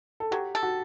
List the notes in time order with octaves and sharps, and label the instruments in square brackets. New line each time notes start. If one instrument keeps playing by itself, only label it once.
[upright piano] A4
[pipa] F#3 [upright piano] G4
[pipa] A4
[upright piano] F#4